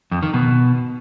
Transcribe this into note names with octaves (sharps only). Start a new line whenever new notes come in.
F2
D#3
B2